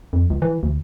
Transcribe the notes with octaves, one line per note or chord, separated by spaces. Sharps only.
F2
C#2
E3
D2